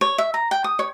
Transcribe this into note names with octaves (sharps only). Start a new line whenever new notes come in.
C#5
E5
A#5
G5
D#6
C#5